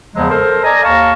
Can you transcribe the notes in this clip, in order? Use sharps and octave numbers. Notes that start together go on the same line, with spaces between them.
E2 C#3 F3 F#3 G#3
A4 A#4 C5
D5 D#5 G#5 A#5
D#2 F5 A5 A#5 C#6